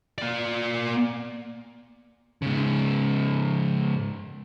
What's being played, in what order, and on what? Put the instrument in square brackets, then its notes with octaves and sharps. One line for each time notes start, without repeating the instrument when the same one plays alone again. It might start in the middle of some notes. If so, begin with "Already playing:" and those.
[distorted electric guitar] A#3 D5
[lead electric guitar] G#2 C#3